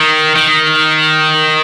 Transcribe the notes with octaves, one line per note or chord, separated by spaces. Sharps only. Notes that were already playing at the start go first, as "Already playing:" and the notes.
Already playing: D#3
D#3